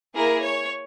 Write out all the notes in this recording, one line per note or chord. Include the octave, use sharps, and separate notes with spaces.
A#3 E4 G#4 A#4
C#5